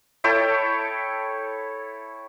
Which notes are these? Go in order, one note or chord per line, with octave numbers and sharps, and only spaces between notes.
E4 A4 C#5 G5